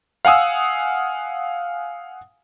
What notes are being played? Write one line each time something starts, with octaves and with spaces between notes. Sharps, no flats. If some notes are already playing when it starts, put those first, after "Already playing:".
F5 F#5 G#5 D#6 E6